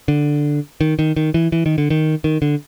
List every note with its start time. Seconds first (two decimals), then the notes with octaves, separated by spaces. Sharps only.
0.08 D3
0.81 D#3
0.99 D#3
1.16 D#3
1.34 E3
1.52 E3
1.66 D#3
1.78 D3
1.90 D#3
2.24 D#3
2.42 D3